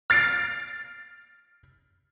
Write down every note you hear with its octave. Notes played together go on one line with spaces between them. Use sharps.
F6 A6 C7 D7